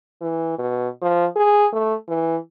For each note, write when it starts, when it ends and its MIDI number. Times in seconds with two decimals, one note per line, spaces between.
0.21 0.55 52
0.58 0.88 47
1.02 1.26 53
1.36 1.67 68
1.73 1.94 57
2.08 2.37 52